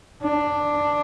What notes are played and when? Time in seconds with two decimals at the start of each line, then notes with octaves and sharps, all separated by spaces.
0.23 D4